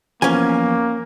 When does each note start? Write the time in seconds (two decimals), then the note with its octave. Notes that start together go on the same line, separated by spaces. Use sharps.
0.22 E3 F3 A#3 B3 C#4 G#5